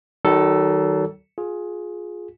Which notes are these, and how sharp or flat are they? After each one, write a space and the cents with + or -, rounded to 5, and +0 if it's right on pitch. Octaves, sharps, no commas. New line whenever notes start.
D#3 +0 F#3 +40 A4 +0
F4 +25 G#4 +10